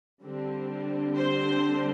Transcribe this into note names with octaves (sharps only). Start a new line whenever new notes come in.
D3 G3 C4
C5